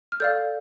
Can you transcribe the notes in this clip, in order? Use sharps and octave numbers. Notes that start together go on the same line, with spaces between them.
F6
A4 D5 F5 G6